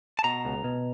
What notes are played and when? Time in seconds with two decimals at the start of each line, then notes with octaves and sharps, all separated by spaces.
0.19 A5
0.24 B2 A#5
0.45 C#2
0.64 B2